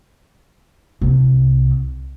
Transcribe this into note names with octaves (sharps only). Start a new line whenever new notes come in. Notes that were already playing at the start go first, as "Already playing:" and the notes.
C2